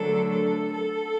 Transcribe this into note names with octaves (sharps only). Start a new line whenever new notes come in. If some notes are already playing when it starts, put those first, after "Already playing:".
Already playing: D3 F#3 A3 D4 A4
A4
A4